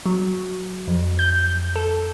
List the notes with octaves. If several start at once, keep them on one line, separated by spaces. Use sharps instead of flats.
F#3
F2
G6
A4